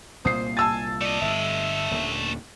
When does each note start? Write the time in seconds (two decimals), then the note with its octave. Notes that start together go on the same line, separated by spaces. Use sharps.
0.25 C2 A#2 A#3 C5 D#6 C7
0.57 G#5 A5 E6 A6
1.01 A3 D5 D#5
1.21 G1 G2 E5
1.91 D#1 A#2 D3